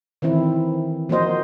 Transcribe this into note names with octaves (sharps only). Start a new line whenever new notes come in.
D#3 E3 C4 E4
F3 A#3 F#4 C5 D#5